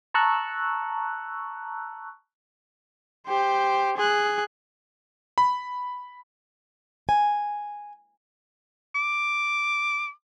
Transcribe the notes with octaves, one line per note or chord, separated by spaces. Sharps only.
A5 A#5 C#6 E6 F#6
G4 C5
G#4 F#6
B5
G#5
D6